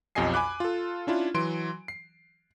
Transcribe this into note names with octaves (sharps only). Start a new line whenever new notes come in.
B1 F2 G4 D#5 G#5 C7
G#5 B5 D6 F#6
F4 A4
C#4 D4 E4 F4
E3 F#3 C6 D7
C7